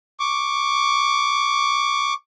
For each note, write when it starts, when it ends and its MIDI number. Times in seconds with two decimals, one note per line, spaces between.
0.20 2.14 85
0.20 2.14 86